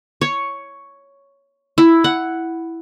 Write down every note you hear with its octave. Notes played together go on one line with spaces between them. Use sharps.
C#5
E4
F#5